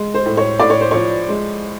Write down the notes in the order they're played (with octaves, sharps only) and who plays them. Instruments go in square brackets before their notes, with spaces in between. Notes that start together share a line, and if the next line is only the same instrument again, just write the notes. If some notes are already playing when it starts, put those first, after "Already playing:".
Already playing: [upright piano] G#3
C5
A2
C#5
A2 D5
C#5
C5
F3 C#5
G#3